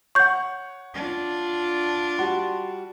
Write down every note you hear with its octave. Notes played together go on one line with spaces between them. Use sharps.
C#5 F#5 C#6 G6
D4 F4
G3 F#4 C6